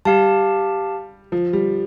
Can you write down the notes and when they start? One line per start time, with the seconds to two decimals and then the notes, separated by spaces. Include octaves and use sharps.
0.05 G3 G4 F5 A5
1.32 F3
1.53 G3